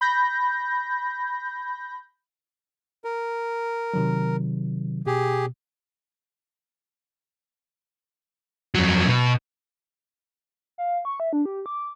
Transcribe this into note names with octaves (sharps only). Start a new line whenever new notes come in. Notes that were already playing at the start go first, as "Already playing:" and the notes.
B5 G6 A#6
A#4
C3 D#3 F#3
B2 G4 G#4
F2 F#3
B2
F5
C#6
E5
D4
G4
D6